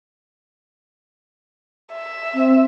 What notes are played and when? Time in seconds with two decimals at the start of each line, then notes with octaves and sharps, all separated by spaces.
1.94 E5
2.34 C4